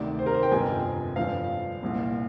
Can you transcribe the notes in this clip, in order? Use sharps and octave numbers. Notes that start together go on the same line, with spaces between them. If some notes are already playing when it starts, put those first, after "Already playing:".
Already playing: D2 C3 D#3 D5
C5
A#4
C5
G5
G1 F2 C3 F3 G#5
G1 G2 F3 F5
C2 A#2 F3